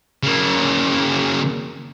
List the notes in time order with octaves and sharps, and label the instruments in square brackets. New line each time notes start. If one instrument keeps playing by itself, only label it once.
[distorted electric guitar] C#3 A#3